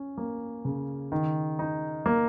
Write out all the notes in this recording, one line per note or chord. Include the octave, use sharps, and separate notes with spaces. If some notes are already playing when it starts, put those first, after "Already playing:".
Already playing: C#4
A#3
C#3
D#3
D#4
A#3